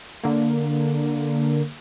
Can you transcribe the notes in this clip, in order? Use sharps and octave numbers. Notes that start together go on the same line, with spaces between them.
D3 A#3